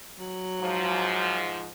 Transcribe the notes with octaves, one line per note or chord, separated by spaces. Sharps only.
F#3
G#2 F3